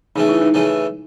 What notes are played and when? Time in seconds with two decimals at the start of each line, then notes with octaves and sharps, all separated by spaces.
0.16 C#3 E3 A3 D#4
0.29 E4
0.41 D#4
0.54 C#3 E3 A3